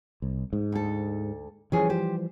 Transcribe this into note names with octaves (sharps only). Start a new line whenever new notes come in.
C2
G#2
D2 A4
E3 F3 G3 C#4 G#4
G4 C5